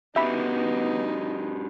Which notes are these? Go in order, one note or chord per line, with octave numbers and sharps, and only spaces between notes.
B3 D4 D#4 F#4 G4 E5 B5